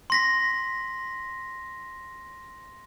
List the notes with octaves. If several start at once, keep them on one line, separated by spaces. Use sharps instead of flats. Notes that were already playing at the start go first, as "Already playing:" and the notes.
C6 A#6 B6